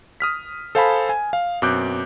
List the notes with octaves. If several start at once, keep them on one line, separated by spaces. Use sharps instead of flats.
D#6 F6 B6
A4 C5 F5 G#5 A5 B5
G#5
F5
F#2 B2 C4 D6 F#6 G6